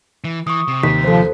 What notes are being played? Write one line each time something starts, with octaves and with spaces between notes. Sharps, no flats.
E3
E3 C#6 D#6
C3
D#2 B6
F3 A4 C5